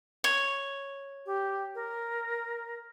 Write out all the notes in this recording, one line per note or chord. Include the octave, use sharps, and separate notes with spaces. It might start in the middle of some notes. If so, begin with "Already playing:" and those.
C#5
G4
A#4